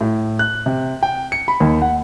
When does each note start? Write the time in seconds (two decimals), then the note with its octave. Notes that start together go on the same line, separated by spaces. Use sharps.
0.01 A2
0.39 F#6
0.66 C3
1.03 G5
1.32 C#7
1.48 B5
1.60 D#2
1.82 F#5